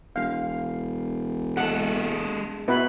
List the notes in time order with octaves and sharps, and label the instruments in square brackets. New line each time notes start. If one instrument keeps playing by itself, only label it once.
[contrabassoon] E1 [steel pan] F5
[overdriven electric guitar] G#3 A4 [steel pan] F#5
[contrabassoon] B2 [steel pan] E4 B4